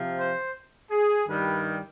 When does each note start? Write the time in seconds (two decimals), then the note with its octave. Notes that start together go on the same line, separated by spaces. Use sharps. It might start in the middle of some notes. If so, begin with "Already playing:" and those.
Already playing: C3 F3
0.20 C5
0.91 G#4
1.28 G2 D#3 G3 B4